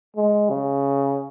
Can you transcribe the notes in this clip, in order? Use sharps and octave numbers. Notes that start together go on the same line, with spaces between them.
G#3
C#3